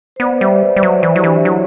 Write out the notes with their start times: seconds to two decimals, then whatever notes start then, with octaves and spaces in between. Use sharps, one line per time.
0.16 C5
0.20 B3 B4 D5
0.41 G3 C5 E5
0.61 B4 D5
0.76 G3
0.83 F#3
1.03 E3 E4
1.16 F#3 G4
1.24 E3 D4 F#4
1.45 F#3 E4